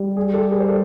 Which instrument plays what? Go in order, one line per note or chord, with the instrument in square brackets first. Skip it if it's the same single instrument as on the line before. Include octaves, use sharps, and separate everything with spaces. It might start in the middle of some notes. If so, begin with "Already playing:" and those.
Already playing: [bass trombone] G3
[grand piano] G#4
G4 A4
G#4 A#4
C5
A4